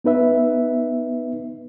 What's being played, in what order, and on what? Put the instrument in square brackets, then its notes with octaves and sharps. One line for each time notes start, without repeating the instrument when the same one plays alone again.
[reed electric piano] B3 D#4 B4 E5